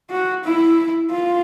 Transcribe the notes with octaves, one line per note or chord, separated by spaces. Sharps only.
F#4
E4
F4